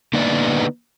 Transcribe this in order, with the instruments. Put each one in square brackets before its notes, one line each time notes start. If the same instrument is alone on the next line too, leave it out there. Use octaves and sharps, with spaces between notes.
[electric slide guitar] D3 A#3 B3 D#4 B4 D5